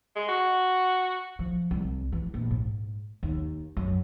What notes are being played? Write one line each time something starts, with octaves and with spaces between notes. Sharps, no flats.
G#3
F#4
F3
C2
E3
A#1
G#2
D#2
F#2